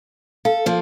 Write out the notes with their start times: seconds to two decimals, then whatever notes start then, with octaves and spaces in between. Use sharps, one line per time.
0.45 A4 F5
0.66 F3 A#3